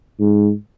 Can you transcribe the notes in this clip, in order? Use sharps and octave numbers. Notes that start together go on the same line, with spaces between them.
G#2